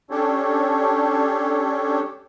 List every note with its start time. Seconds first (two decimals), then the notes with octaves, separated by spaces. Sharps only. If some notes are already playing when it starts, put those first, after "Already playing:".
0.10 C#4 D4 G4 A4 C#5